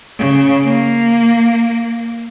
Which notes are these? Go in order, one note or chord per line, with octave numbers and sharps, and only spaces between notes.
C#3
A#3